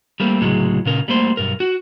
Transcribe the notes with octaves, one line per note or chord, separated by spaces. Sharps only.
G3 A3 A#3 C4
C#2 A2 C3 F#3 G#3
A#2 C#3 A#4
G3 A3 A#3 C5
B1 G2 A#4
F#4